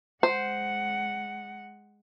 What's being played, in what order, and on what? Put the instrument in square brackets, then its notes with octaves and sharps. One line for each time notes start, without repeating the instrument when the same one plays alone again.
[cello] G#3 F#5 [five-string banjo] C5